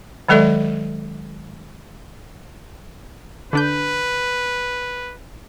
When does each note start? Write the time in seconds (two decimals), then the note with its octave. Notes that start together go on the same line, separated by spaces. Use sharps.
0.29 D#3 F#3 G#3 A4 D5 E5
3.53 D3 D4 B4 G6